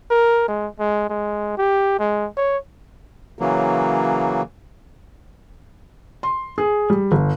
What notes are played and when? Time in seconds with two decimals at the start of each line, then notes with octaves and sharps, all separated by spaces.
0.10 A#4
0.48 G#3
0.79 G#3
1.10 G#3
1.58 G4
2.00 G#3
2.37 C#5
3.39 C#3 E3 F#3 A#3
6.23 C6
6.58 G#4
6.90 G3
7.12 G1